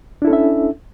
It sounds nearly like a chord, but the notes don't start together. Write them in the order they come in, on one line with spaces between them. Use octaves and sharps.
D4 E4 A4 C#4 E5